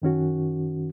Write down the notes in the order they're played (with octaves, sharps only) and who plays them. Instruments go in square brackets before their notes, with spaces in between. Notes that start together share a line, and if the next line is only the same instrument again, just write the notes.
[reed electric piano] F#2 D#3 C#4 F#4